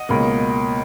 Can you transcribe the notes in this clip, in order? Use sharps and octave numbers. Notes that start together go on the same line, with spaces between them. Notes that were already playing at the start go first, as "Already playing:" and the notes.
Already playing: D#5 F#5
C#2 B2 A#3